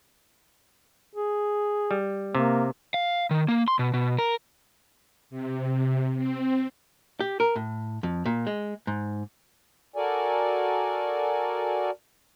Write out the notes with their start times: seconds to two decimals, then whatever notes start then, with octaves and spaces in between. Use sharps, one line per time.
1.16 G#4
1.91 G3
2.35 C3 A#3
2.94 F5
3.31 D#3
3.48 A#3
3.68 C6
3.79 B2
3.94 B2
4.19 A#4
5.30 C3
6.17 C4
7.20 G4
7.40 A#4
7.56 A2
8.03 F2
8.26 A#2
8.47 G#3
8.87 G#2
9.96 F#4 A4 A#4 D5 G#5